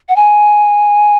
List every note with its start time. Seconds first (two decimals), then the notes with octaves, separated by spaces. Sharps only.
0.09 F#5
0.16 G#5